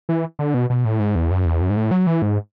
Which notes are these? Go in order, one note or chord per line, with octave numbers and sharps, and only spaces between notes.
E3
D3
B2
B2
A2
G#2
E2
F#2
E2
F#2
G#2
A2
F#3
E3
G#2